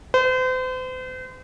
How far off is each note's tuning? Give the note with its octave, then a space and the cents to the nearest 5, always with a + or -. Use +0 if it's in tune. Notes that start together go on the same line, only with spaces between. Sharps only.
C5 -40